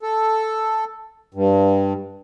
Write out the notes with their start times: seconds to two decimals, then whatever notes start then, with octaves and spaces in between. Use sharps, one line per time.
0.02 A4
1.34 G2